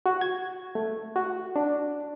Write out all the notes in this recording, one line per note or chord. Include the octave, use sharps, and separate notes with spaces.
F#4
G#6
A3
F#4
D4